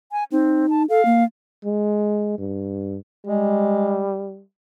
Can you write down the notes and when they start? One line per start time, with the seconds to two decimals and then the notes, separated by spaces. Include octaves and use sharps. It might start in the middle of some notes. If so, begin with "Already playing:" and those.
0.12 G#5
0.32 C4 D#4
0.70 A5
0.89 A4 F5
1.05 A#3
1.65 G#3
2.38 G2
3.27 G3 G#3